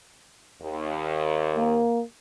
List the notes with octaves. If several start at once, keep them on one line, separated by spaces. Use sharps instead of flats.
D#2
A#3